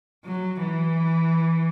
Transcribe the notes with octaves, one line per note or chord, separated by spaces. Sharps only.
F#3
E3